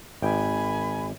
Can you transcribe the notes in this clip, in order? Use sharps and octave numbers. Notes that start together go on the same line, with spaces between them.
G#1 G5 G#5 B5